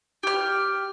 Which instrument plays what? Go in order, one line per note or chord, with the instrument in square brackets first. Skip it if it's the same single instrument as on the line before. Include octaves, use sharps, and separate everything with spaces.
[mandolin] G4 F6